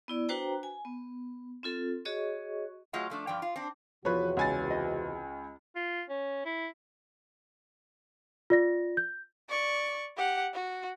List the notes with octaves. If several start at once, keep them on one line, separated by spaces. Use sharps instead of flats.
B3 E4 D5
D4 F#4 B4 C5 G5 A#5
G#5
B3
C4 F4 A4
F#4 G#4 C#5 D#5 C#6
F#3 A3 F4 G#4 D#5 F#5
F3 A3 D4
G2 F3 D5 G5
F4
C4 D4
E2 C3 F3 F#4 B4 C#5
C#2 G#5 A6
D#5
F4
C#4
E4
F4 D5 A#6
G6
D5 C#6
G4 F#5
F#4